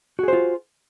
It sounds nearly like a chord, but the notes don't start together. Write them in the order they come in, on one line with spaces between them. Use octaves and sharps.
F#4 G#4 C5 F4